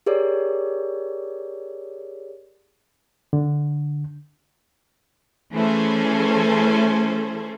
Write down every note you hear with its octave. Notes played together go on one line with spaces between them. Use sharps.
G4 G#4 A#4 C#5 D5
D3
E3 A3 C#4 G#4 A4 C5